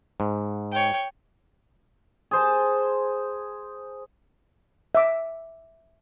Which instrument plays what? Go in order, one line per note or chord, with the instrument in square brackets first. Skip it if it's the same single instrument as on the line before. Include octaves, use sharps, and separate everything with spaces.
[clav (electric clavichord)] G#2
[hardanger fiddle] C#5 G5
[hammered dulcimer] G#4 C5 A5
[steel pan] E5 D6